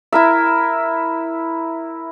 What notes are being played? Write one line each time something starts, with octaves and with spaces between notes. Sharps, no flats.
E4 A#4 E5